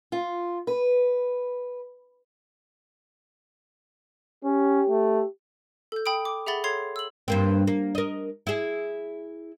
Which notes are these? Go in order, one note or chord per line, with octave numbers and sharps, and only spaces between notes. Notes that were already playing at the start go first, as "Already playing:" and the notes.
F4
B4
C#4 G4
A3
A4 G6
G5 B5 D#6 D7
D6
G#4 E5 F#5 B5 A6 G7
A4 C#5 C6 G#6 C7 F7
E6 F#7
G2 A#3 C4
A#3
A#4 D#5
E4 G#4